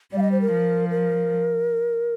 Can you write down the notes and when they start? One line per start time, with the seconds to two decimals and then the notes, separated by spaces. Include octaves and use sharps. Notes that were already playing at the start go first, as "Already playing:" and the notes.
0.12 G3 D5
0.18 F5
0.22 D#5
0.32 C5
0.41 A#4
0.51 F3
0.91 A#4